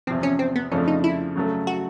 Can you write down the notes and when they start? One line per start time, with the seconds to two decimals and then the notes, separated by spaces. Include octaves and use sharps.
0.07 E2 C3 F3 C4
0.23 C#4
0.39 C4
0.56 B3
0.72 F2 C#3 F3 A3 C#4 D4
0.88 D#4
1.04 E4
1.36 C#3 F#3 A3
1.67 F#4